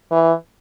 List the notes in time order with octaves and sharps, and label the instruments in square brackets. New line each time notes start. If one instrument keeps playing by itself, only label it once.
[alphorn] E3